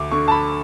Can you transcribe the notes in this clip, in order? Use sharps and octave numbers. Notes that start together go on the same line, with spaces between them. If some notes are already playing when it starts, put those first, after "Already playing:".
Already playing: D2 D6
D3 C#6
A5
B5